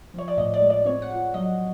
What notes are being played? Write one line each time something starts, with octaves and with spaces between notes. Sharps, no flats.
F3 C#5
D5
A2 D#5
D5
G#3
D5
C4 C#5
F#5
F3
F#3 D#5